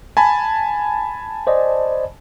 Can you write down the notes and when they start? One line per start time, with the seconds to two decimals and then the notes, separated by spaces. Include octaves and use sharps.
0.17 G#5 A5 B5
1.47 C5 D5 D#5